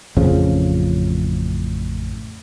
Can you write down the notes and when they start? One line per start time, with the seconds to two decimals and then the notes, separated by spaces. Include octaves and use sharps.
0.17 A1 F2 C#3 F3